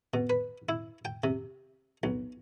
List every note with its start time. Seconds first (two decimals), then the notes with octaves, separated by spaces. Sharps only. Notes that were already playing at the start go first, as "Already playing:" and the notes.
0.14 B2
0.30 B4
0.69 E4
1.05 G5
1.24 C3
2.03 B1